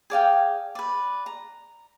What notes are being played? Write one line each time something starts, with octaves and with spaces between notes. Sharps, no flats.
G#4 D5 F5 G5
B4 D5
A#5